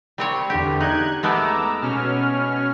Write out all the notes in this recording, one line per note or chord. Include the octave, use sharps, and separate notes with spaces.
G3 C4 C#5
E2 D3 G4
D#4 F#6 G#6
G#3 A3 B3 A#5 D6 E6
B2 C#4 F6